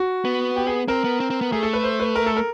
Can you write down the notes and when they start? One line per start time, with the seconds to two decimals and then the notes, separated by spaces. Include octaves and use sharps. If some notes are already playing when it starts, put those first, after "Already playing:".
Already playing: F#4
0.25 B3
0.56 G4
0.67 G#4
0.88 C4 A#4
1.04 B3
1.20 C4
1.30 C4
1.41 B3
1.52 A3 G#4
1.63 A4
1.73 B4
1.84 C5
2.00 B4
2.16 A#4
2.26 A4
2.37 A#4